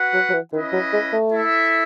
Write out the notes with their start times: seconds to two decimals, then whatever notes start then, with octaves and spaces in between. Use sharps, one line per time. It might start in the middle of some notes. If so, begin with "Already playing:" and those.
Already playing: F#4 B4 F#5
0.13 F#3
0.29 F#3
0.33 E3
0.53 D#3 C#4 E4 B4 D#5
0.73 F#3
0.93 G#3
1.13 A3
1.33 E4 A4 E5